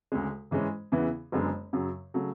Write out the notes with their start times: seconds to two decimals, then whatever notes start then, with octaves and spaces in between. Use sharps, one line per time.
0.12 D2 C#3 G#3
0.51 G#2 E3 G#3 C#4
0.92 E2 C#3 E3 B3 E4
1.32 F#1 F#2 D3 G#3 B3
1.73 F#2 C#3 F#3
2.14 C#3 F#3 A3